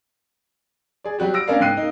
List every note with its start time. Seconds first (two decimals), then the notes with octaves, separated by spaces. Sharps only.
1.04 G#4 D5
1.19 F#3 G3 F#4 G4
1.34 E6 A#6 D7
1.47 A#3 C#4 D4 A#4 D5 F5
1.60 G#2 G5 F#6 C7 D#7
1.77 A#3 D#4